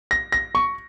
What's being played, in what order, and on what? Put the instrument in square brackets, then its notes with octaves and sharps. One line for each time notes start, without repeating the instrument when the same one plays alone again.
[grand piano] A#6
A#6
C#6